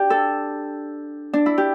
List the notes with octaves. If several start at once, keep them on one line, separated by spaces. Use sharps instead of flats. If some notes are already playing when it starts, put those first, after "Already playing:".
Already playing: D4 G4
A4
D4
E4
G4